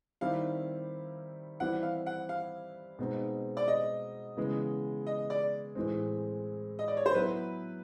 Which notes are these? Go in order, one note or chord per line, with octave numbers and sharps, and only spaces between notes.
D#3 G3 C4 E4 F5
E3 G3 C4 E4 F#5
F5
F#5
F5
B2 G#3 C4 D#4
D5
D#5
C#3 E3 G#3 B3
D#5
D5
A2 E3 G#3 C4
D#5
D5
C#5
C5
F#3 B3 E4 B4